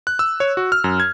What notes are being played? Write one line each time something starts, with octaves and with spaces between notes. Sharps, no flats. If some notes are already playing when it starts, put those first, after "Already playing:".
F#6
E6
C#5
F#4
F6
F#2
G#6